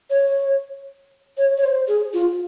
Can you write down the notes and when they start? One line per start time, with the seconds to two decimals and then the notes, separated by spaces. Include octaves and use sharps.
0.10 C#5
1.37 C#5
1.58 C#5
1.63 C5
1.88 G#4
2.14 F4